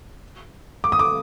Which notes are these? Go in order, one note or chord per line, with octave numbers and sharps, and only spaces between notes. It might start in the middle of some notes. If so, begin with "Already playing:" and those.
D6
D#6
D6